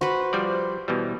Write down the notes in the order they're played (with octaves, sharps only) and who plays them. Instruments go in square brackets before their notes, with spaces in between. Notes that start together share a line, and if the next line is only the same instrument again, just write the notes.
[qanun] F#4 B4 [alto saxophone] C5
[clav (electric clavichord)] F3 G3 D5
B2 E3 G3